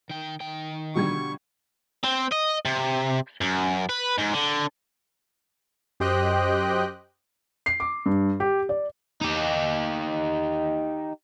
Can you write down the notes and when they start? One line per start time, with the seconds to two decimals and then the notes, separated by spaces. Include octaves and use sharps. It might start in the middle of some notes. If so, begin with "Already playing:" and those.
0.10 D#3 G5
0.41 D#3 G5
0.95 B2 D3 F3 G3 C#6 G#6
2.04 C4
2.32 D#5
2.65 C3
3.41 F#2
3.89 B4
4.18 G#2
4.33 D3
6.00 F#2 G4 C5 D#5 G5 F#6
7.66 C7
7.80 D6
8.06 G2
8.40 G4
8.69 D5
9.21 D#4 G4